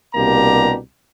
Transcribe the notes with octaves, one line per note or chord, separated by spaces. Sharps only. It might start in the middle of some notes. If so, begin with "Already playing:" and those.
C2 B2 A#3 D4 G4 A#5